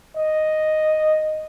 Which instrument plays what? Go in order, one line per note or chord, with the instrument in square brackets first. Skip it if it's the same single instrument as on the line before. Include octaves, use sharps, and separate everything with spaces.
[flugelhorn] D#5